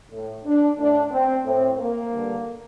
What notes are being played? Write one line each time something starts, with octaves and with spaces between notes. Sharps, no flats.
A2
D4
A2 D4
C4
A2 C4
A#3
G2 D3